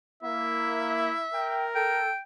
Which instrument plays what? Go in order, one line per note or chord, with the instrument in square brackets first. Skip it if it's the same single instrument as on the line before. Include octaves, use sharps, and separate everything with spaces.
[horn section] A#3 [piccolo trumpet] E4 [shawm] E5
[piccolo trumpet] A#4 [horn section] G5
[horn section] A4 [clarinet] G5